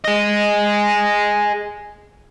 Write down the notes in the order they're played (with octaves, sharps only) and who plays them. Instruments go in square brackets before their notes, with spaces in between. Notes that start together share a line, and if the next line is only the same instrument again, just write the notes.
[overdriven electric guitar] G#4 D#5